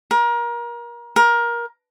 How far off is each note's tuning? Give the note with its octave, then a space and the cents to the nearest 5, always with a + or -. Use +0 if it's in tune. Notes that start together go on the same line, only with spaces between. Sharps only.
A#4 +30
A#4 +20